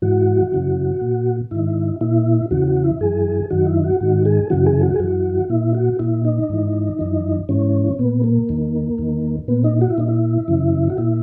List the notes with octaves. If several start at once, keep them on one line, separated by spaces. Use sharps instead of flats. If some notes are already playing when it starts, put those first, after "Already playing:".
G#2 E3 F#4
F#2 C#3 E3
A#2
G#2 D#3 E4
A#2 E4
E2 C#3 E3 F#4
F#4
E4
F#2 E3 G#4
F#2 D#3 F#4
E4
F#4
G#2 D#3 F#4
G#4
F#2 C#3 E3 F#4
G#4
F#4
G#4
F#2 E3 F#4
A#2 E4
F#4
A#2 E4
D#4
G#2 E3
F#2 E3
G#2 E3 C#4
A#2 B3
A#3
E2 D#3
E2 D#3
A#2 B3
D#4
F#4
E4
A#2 D#4
E4
F#2 C#3 E3
F#4
A#2 E4